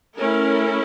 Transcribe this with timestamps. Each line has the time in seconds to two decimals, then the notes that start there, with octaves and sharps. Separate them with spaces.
0.16 A3 C#4 E4 A#4